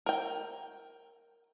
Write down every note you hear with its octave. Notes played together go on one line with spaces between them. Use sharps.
A#4 G5